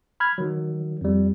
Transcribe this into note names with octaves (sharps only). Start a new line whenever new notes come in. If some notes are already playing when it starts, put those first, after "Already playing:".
B5 F6 G#6
D#3 F#3
F2 G3